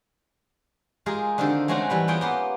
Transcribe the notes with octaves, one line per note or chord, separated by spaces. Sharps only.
G#3 F4 G4 G#4 A#4
D3 D#3 C4 F4 G4 A4
G#3 A3 C4 C#4 F#4
E3 G3 B5
B3 F4 F#4 G#4 G5
A#3 B3 G4